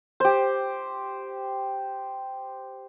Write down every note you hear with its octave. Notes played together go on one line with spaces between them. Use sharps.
G4 C5